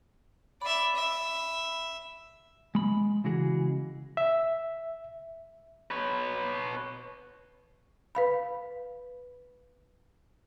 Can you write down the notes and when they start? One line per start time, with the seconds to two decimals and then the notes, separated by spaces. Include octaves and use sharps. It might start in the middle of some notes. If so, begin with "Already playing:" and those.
0.62 D5 E5 B5
0.96 E5
2.75 G#3 B5
3.24 C#3 E3 G#3 F#4 G#4
4.17 E5
5.91 B4 C#5
8.15 B4 F5 B5